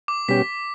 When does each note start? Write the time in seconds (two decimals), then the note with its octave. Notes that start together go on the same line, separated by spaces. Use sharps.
0.08 D6
0.28 B2 G3 C#4 G4 B6